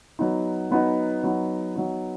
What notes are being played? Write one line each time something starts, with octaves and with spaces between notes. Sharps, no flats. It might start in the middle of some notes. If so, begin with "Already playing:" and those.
F#3 B3 D#4
F#3 B3 D#4
F#3 B3 D#4
F#3 B3 D#4